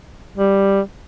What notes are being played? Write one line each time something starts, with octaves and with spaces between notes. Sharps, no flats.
G3